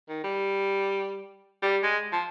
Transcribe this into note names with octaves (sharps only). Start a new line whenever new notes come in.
D#3
G3
G3
G#3
F3